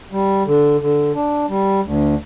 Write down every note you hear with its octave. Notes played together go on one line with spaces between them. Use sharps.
G3
D3
D3
D4
G3
D2